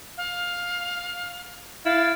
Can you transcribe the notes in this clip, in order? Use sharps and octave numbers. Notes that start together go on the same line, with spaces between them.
F5
E4 F5 A6